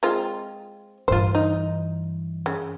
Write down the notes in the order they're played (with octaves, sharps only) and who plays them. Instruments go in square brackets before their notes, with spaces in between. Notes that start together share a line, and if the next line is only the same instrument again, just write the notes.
[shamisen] G#3 C4 F4
[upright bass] G2 E3 [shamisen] F4 C5
[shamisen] D#4
C#3